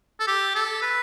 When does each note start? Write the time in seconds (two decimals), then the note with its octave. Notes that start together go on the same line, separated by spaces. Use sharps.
0.20 A4
0.28 G4
0.55 A4
0.82 B4